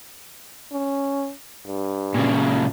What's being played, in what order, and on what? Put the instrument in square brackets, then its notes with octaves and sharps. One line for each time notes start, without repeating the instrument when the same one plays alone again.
[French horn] C#4
G2
[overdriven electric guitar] A#2 C#3